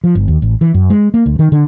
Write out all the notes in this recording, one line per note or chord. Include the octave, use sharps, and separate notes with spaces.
F3
G1
D#2
A1
E3
F#2
G#3
A#3
D2
D#3
D3